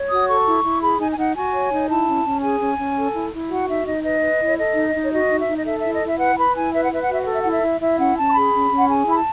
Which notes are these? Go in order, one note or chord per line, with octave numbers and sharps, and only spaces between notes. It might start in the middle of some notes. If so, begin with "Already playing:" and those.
Already playing: C#5
F#4 D#6
A4 C#6
E4
E4
G#4 B5
D#4 G#5
G#5
D#4 F#5
F#4 G#5
C#5
D#4
E4 A5
C#4
C#4
G#4 G#5
C#4
C#4
A4
E4
E4
F#4 F#5
D#4 E5
D#4 D#5
B4 D#5
B4
E4
C#5
A4 D#5
D#4
D#4
C#5
F#4 D#5
D#4
E5
D#4
D#5
A4 E5
E4 E5
D#5
E4 E5
B4 F#5
B4 B5
E4 G#5
B4 E5
F#5
B4 E5
F#5
F#4 E5
F#5
A4
E5
E4 F#5
E5
E4
E4 E5
C#4 F#5
C#4 A5
C#6
G#4 B5
C#4
C#4
F#5
G#4 G#5
E4 B5
A5